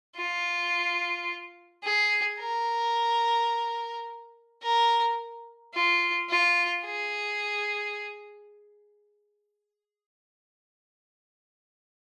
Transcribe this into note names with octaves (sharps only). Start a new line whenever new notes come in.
F4
G#4
A#4
A#4
F4
F4
G#4